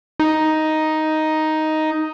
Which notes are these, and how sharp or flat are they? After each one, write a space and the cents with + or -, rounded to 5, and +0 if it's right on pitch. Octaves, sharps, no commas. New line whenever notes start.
D#4 +5